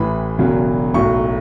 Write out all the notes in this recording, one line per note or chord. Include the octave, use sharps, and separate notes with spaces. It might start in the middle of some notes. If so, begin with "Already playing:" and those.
Already playing: A1 A2 E3 B5
E1 E2 C#3 F#3
B1 A2 F#3 C#6